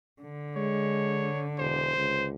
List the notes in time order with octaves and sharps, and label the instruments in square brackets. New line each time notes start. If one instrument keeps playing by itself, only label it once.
[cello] D3
[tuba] G#3 [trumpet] C#5
[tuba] E1 [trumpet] C5
[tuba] C#2